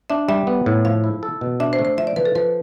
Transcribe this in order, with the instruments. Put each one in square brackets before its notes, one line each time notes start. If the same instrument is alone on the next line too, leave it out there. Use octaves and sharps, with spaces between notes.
[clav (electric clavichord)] D4 [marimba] E5
[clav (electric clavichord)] G3 [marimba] E5
[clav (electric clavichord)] B3
A2
[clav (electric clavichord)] F3 [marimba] F5
[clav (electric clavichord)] E4
A4
B2
[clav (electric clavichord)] D4 [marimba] E5
[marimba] C5
[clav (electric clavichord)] A3
[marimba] C5
[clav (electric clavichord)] F3 [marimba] E5
[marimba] D5
[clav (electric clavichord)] F3 [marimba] B4
[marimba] A4
[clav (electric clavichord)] F3 [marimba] B4